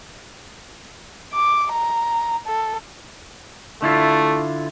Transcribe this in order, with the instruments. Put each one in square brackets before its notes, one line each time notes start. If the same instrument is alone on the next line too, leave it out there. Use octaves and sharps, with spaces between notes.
[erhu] D6
A#5
A4
[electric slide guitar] D3 E4 F4 [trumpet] A3